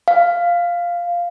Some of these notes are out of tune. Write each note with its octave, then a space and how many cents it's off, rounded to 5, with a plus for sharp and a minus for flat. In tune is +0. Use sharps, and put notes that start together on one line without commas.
F5 +0